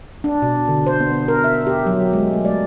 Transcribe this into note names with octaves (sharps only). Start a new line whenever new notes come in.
D4
B2
D3
C5
B3
A#4
E5
G4
F#3
G#3
A3
D5